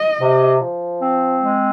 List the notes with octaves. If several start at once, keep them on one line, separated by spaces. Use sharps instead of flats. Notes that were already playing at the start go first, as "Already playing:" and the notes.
Already playing: D#5
C3
F3
C4
G#3